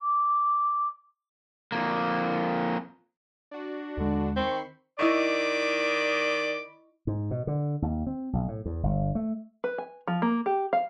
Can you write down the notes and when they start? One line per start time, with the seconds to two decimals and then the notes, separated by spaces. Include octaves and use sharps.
0.02 D6
1.72 F2 A#3
3.51 D4 F#4
3.98 D#2 D3 G#3
4.36 D#3 C4 B5 C#6 C7
4.99 D#3 E4 D5 D#5 B5 C#6 D6
7.07 G#2
7.31 B2
7.47 D3
7.82 D#2
8.07 C4
8.33 B1
8.48 A2
8.66 E2
8.83 G1
9.15 A3
9.64 B4
9.78 G#5
10.07 F3
10.22 A#3
10.46 G4
10.73 F5